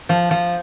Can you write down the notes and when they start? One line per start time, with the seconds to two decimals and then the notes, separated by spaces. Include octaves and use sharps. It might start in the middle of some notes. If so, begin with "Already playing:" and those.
0.09 F3
0.31 F3